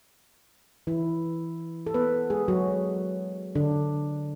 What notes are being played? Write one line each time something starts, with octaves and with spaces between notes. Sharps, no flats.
E3 E4
A4
B3 B4
G#3 G#4
F#3 F#4
D3 D4